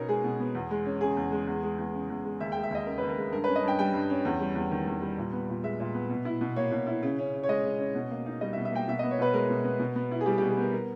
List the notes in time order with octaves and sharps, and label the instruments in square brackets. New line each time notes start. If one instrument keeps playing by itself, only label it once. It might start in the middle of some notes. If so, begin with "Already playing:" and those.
Already playing: [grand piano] B2 B3 C#4 D#4 A#4 C#5
G#3 G#4
B2
B3
E2
G#3
C#4
C#3 G#4
E2
G#3
E2
G#3
E2
C#3
E2
G#3
D#2 E5
G#3 G5
E5
D#2 D#5
C#3 A#4
D#2 B4
A#4
G#3
G2 A#4
C#4 B4
D#5
G2 G5
G3 G5
G2
C#4
E2
G3
E2
D#3
E2
G3
A#2
B3
A#2
G#3 E5
A#2
B3
B2
E4
B2
A#3 C#5
B2
E4
C#3
C#4
C#3
C#5
G#3 D#5
C#3
C#4
B2
A#3
D#4
G3 D#5
E5
B2
E5
A#3 G5
B2 E5
B3 D#5
C#5
B2 B4
G#3 A#4
B2
B3
B2
B3
E4
G#4
G3 G4
B2 G4
G#4
B3 A#4
A#4